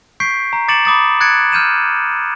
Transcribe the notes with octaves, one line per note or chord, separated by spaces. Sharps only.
C#6 G6 B6 C7 D7
A#5
D6 A6 C#7 D7 E7 F#7
B5 D6 D#6 A6
F#6 G#6 A6 C#7 D7
F6 G6 D#7 E7